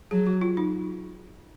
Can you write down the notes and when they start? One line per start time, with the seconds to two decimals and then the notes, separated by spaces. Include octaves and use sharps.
0.11 F#3 G#4
0.27 F#4
0.41 F4
0.57 D#4